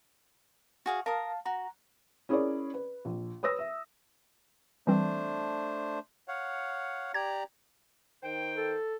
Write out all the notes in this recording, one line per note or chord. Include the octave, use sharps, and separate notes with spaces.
F#4 G#4 F5
A#4 F5 A5 D#6
F#4 A#5
C#4 E4 G#4 A#4 C#5 D5
B4
A#1
B4 C#5 D#6 E6 A#6
E5
E3 G3 A3 C4 D4 C5
C#5 F5 F#5
G4 D5 A#5 G#6
D#3 C5 G5
A4